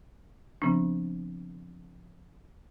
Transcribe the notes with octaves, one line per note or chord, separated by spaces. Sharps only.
C#3 F3 B3 C4 D4